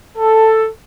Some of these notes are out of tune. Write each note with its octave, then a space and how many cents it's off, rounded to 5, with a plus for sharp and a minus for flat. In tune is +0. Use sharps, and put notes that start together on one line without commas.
A4 +5